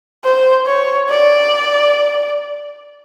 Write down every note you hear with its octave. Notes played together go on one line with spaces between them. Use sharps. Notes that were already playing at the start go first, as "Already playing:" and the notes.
C5
C#5
D5